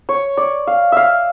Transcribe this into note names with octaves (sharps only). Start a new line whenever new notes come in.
C#5
D5
F5
E5 F5